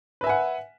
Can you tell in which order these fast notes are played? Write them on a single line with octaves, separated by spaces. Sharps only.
B4 E5 G#5 F#5